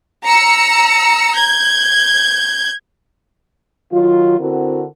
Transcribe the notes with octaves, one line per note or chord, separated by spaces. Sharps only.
A#5 E6 C#7
G6 G#6
D#3 F#3 F4
D3 C4 E4 F#4 A#4